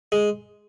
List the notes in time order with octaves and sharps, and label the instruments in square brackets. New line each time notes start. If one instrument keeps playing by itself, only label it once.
[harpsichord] G#3